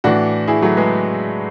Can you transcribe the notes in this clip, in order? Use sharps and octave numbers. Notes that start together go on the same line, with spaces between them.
A2 E3 D4 F#4
E4 G#4
F#3 A3
G#3 B3